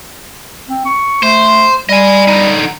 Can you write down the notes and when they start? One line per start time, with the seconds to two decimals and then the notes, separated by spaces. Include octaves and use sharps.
0.68 C4
0.85 C#6
1.23 A3 C5
1.89 G3 D#5 G#5
2.28 D3 D#4